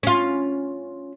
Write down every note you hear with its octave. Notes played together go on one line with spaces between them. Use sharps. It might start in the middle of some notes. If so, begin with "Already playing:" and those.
C#4 F4